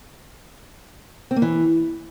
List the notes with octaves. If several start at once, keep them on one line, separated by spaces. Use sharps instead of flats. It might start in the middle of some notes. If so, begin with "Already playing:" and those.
C4
A#3
E3